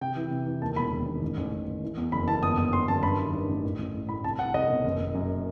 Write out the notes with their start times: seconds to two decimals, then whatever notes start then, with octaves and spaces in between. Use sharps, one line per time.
0.01 C3 G5
0.16 E3
0.31 C3
0.46 E3
0.62 D#2 A5
0.76 E1 B5
0.92 E1
1.07 D#3
1.22 A1
1.37 A1
1.52 A1
1.67 A1
1.82 E3
1.97 E2
2.12 F#1 B5
2.27 E3 A5
2.43 G1 D#6
2.57 G1 D#6
2.73 G1 C6
2.88 F#2 A5
3.03 G2 B5
3.18 D#3
3.33 G2
3.49 A1
3.64 A2
3.78 A1
3.94 A2
4.09 A2 B5
4.24 C2 A5
4.39 C2 F#5
4.54 C2 D#5
4.70 B2
4.84 F#1
5.00 F#1
5.14 F#2